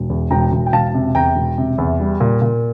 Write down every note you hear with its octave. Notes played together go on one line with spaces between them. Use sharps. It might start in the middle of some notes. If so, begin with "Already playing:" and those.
Already playing: E1
E2
E1 G5 A#5
E1
G5
E1 F5 A5
C3
E2 G5 A#5
E1
C3
E2
G3
A#2
A#2